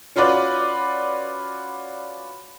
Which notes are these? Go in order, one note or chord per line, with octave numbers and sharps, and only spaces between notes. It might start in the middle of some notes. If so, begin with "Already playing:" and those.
C#4 F4 F#4 B4 D5